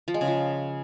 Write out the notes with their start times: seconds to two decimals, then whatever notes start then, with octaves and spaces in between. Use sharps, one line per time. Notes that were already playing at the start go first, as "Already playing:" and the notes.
0.08 F3
0.14 G#3
0.21 C#3
0.28 F3